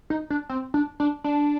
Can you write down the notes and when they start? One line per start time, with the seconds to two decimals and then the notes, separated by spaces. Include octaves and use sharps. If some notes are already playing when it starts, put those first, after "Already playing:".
0.10 D#4
0.30 D4
0.49 C4
0.74 D4
1.00 D4
1.24 D4